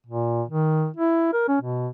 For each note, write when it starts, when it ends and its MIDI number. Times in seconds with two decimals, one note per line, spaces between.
0.06 0.43 46
0.48 0.89 51
0.97 1.32 64
1.33 1.45 70
1.48 1.57 61
1.61 1.88 47